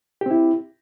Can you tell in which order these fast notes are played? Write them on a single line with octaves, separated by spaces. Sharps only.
G4 C4 E4